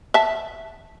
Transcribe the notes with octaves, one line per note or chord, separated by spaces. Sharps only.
E5 A5